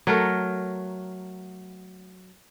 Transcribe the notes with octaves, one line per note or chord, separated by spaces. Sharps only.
F#3 A3 A#4